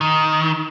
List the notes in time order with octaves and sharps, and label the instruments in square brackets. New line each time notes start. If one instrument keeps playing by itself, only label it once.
[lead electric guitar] D#3